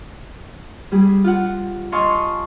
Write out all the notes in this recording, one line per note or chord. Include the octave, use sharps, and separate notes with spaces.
G3 G#4
F4 F#5
D#5 F5 G#5 A5 C6 C#6